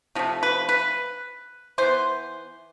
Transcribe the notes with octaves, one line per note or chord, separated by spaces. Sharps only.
C3 F3 A3
B4
B4
E3 B3 C5